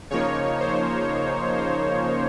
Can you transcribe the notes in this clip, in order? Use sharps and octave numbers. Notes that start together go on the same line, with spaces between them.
C#3 F3 A#3 D#4 C#5
C5
C5